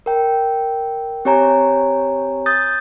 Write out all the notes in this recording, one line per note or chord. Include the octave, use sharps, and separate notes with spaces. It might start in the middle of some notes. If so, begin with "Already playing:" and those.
A#4 G5
C4 G4 C#5 G#5 A#5
D#6 G6 A6